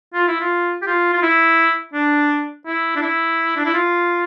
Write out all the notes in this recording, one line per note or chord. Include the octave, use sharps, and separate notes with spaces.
F4
E4
F4
G4
F4
F4
E4
D4
E4
D4
E4
D4
E4
F4